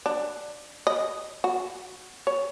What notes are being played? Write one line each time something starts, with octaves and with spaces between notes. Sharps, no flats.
D4
D#5
F#4
C#5